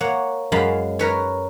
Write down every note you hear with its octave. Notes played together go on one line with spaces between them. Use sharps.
A#3 C#5 F#5
F#2 F#3 G#3 F5 A5 B5
A#4 B4 C#5